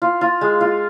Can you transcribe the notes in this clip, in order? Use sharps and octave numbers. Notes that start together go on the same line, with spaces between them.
F4
F4
G#3
F4